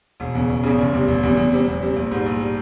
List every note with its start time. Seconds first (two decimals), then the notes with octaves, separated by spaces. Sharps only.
0.20 E1
0.35 E2 C#3
0.49 E1
0.63 E2 C#3
0.78 F1
0.93 E2 C3 G3
1.08 F1
1.23 E2 C3 G3
1.37 E2
1.52 C3 G3 C4
1.67 E2
1.81 C3 G3 C4
1.96 A#1
2.11 G#2 G3
2.26 A#1
2.40 G3